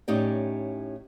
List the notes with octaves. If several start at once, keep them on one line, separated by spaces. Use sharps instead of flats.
A2 C#4 D#4 G4 D5